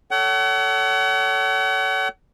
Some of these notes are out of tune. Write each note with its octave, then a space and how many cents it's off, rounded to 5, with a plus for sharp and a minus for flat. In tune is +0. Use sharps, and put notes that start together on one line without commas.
A4 +0 C#5 +25 F#5 +35